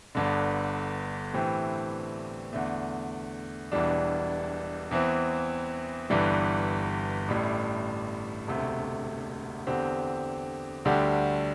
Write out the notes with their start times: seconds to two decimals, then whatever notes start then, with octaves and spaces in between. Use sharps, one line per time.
0.15 G1 G2 D3
1.34 A2 E3 C4 G4
2.53 E2 D3 A3
3.72 E1 E2 E3 G3 D4
4.91 E2 E3 C4
6.10 G1 G2 E3 G3
7.28 A1 A2 G3
8.47 E1 D2 C3 A3
9.67 E2 D3 C4 G4
10.85 D2 D3 G3 D4 G4